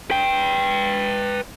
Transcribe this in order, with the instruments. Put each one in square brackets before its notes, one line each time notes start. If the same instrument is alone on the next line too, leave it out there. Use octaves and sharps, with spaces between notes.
[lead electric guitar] B4 G5